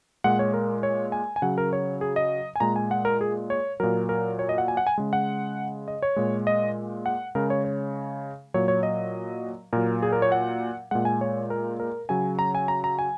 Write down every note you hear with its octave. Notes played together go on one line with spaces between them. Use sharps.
A#2 G#3 F#5
C#5
A#4
C#5
G#5
G#5
C#3 F#3 F#5
A#4
C#5
G#4
D#5
G#5
A#2 G#3 A#5
G#5
F#5
A#4
G#4
C#5
A#2 F#3 A#4
A#4
C#5
D#5
F#5
G#5
F#5
G#5
C#3 G#3
F#5
D#5
C#5
A#2 G#3
D#5
F#5
C#3 G#3 A#4
C#5
C#5
A#2 F#3 C#5
C#5
D#5
A#2 F#3 A#4
G#4
A#4
C#5
F#5
A#2 G#3 F#5
G#5
C#5
A#4
A#4
C#3 F#3 G#5
A#5
G#5
A#5
A#5
G#5